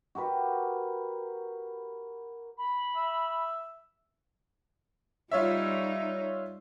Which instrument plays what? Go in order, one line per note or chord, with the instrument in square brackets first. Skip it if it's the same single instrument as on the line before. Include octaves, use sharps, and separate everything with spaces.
[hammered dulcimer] F#4 G4 A#4 B4
[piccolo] B5
[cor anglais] E5
[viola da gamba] G3 D#4 [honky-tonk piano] F4 C#5 E5